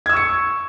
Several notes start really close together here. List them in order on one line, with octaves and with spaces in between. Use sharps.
G#6 E6 C#6 C#7